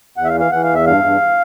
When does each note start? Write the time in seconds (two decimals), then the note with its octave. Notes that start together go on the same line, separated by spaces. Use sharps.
0.17 E2 F#5
0.25 E5
0.29 F5
0.35 E3
0.40 F5
0.52 E3 F#5
0.64 F5
0.69 E2
0.75 E5
0.86 G2 F5
1.04 G2